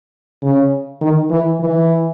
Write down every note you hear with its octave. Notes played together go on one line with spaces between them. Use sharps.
C#3
D#3
E3
E3